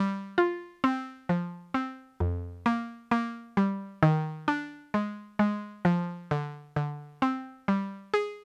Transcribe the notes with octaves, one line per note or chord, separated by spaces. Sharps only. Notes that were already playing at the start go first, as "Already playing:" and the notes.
Already playing: G3
F4
C4
F3
C4
F2
A#3
A#3
G3
D#3
D4
G#3
G#3
F3
D3
D3
C4
G3
G#4